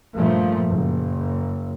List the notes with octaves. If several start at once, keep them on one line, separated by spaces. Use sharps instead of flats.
G2 A#2 F3 A3
F#1